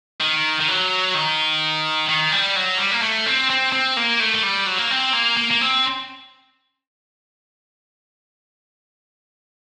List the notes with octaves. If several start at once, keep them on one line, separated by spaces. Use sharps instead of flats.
D#3
D#3
F#3
D#3
D#3
G3
F#3
G3
A#3
A3
C4
C4
C4
A#3
A3
A3
G3
F#3
A#3
C4
A#3
A#3
A#3
C4